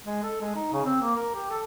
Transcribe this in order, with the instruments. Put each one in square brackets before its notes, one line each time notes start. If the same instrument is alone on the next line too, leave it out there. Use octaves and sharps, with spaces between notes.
[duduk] G#3
A4
G#3
D#4
C#3
C4
A#3
A#4
G4
A4